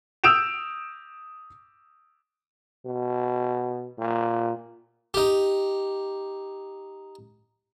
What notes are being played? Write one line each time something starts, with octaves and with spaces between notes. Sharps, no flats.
D#6 E6 G6 D7 E7 F7
B2
A#2
D#4 G4